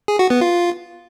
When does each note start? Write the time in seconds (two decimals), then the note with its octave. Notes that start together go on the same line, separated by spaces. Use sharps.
0.08 G#4
0.19 F#4
0.30 B3
0.41 F4